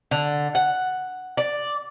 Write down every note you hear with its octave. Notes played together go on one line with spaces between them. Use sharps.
D3
F#5
D5